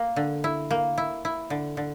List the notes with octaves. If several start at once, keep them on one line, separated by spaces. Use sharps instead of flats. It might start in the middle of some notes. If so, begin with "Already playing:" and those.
Already playing: A#3
D3
E4
A#3
E4
E4
D3
D3